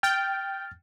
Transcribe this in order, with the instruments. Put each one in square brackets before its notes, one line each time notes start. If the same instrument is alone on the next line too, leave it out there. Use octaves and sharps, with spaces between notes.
[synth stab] G5 [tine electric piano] F6 A6